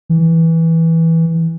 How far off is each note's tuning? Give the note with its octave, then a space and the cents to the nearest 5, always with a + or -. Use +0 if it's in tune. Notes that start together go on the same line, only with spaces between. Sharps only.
E3 -10